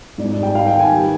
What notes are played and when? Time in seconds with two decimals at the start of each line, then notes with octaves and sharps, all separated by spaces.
0.18 G#2 D5
0.37 G3
0.43 G5
0.55 G3 F5
0.66 G5
0.73 D#3
0.80 G#5
0.92 G3